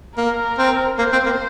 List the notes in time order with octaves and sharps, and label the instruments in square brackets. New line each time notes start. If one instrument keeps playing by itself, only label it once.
[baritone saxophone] A#3 [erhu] A#4
[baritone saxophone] C4
[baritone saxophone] A#3 [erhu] C5
[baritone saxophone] C4
A#3